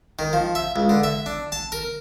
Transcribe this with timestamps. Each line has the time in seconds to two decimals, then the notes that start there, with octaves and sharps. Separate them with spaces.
0.19 D#3
0.33 F3
0.55 E5
0.76 C#2
0.89 D3
1.03 E5
1.26 D4
1.52 A5
1.72 A#4